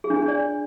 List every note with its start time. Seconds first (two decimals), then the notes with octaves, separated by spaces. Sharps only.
0.04 G#4
0.10 D4
0.16 G#4
0.22 D4
0.28 D5